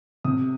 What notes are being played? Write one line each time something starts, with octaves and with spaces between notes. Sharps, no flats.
C3 D#6